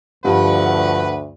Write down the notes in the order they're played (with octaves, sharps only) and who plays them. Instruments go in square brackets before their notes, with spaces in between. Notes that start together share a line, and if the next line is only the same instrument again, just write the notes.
[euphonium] D2 [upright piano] G2 F3 G3 [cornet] B4 [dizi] F#5